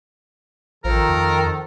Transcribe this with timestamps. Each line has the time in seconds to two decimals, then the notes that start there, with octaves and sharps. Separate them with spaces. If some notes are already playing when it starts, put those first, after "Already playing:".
0.84 A1 D#3 F3 A4 A#4
1.09 F2